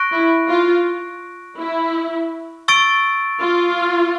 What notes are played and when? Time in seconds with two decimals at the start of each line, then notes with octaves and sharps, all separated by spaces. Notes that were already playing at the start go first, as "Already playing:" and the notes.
Already playing: C#6 F#6 A#6 D7
0.12 E4
0.49 F4
1.58 E4
2.68 C#6 E6 A6 D7
3.41 F4